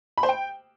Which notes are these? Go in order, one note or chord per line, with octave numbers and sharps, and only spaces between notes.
B5
C5
G5